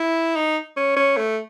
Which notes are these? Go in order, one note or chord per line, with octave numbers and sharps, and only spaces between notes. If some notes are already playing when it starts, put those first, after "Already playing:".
Already playing: E4
D#4
C#4
C#4
A3